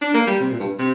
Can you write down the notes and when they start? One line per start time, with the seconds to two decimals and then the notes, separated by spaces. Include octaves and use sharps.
0.02 D4
0.14 A#3
0.27 G3
0.40 C3
0.50 A#2
0.60 G2
0.79 C3